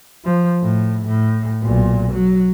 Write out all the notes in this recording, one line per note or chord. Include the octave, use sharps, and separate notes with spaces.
F3
A2
A2
B1 A#2
F#3